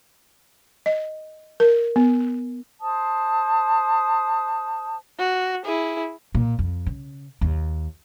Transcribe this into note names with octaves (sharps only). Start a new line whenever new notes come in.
D#5
A#4
B3
C5 A5 D#6
F#4
E4 G#4
A#2
F2
C#3
D#2